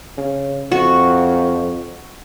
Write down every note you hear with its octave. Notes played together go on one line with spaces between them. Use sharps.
C#3
F2 F#4